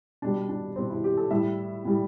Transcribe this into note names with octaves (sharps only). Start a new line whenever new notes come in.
B2 G3 D4
D4
B2 G3 C4
E4
G4
A4
A2 G3 E5
A2 G3